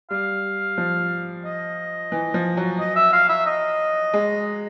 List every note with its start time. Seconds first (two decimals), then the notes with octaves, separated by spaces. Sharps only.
0.10 G3 F5
0.78 F3
1.45 D#5
2.12 E3
2.34 F3
2.57 F#3
2.79 D#5
2.96 E5
3.13 F5
3.29 E5
3.46 D#5
4.14 G#3